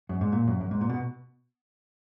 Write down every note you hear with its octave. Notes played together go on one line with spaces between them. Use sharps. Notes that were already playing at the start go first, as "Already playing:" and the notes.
F#2
G#2
A#2
F#2
F#2
G#2
A#2
B2